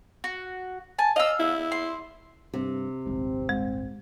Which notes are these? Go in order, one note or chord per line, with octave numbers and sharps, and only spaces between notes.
F#4
G#5 A5
D#5 F5 E6
E4
C6
G2 C3
D#1 G#1 G#2 C4
G#3